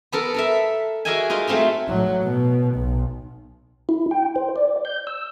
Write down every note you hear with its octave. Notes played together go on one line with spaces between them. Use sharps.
B3 A4 A#4
A4 A#4 E5
F#4 G#4 A#4 D#5 E5 G#5
D#4 F4 A#4 D#5
F#3 A3 C4 F4 E5
A2 F#3
B2
B1
E4
G5
C5
D5
G6
E6